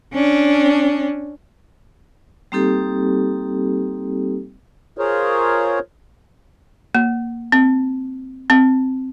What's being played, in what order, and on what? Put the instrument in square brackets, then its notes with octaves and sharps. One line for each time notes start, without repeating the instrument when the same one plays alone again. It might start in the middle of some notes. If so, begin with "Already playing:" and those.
[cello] C#4 D4
[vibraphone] G3 A#3 C4 D#4 G4 A4
[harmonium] F4 G#4 A#4 C5 C#5
[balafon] A#3
C4
C4